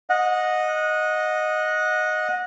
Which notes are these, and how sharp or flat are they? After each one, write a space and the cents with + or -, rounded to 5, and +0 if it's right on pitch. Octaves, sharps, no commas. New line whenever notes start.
D#5 -5 F#5 -25